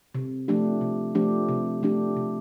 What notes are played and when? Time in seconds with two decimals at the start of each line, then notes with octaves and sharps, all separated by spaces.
0.15 C3
0.48 F3 A3 D4 G4
0.81 C3
1.15 F3 A3 D4 G4
1.49 C3
1.83 F3 A3 D4 G4
2.16 C3